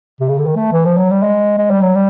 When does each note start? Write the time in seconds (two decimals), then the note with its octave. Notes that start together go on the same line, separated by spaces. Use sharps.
0.20 C3
0.29 C#3
0.39 D3
0.46 D#3
0.56 A3
0.72 E3
0.85 F3
0.97 F#3
1.10 G3
1.23 G#3
1.58 G#3
1.70 G3
1.81 F#3
1.95 G3